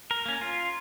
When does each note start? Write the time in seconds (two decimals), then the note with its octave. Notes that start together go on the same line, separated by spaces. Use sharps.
0.11 A#4
0.26 A#3 C#4
0.41 F4